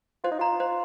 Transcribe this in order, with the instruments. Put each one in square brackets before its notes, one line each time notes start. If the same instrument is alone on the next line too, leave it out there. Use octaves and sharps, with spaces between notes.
[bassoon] F4 [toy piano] C5
[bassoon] D#4
[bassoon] F4 [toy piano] A#5
[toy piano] C5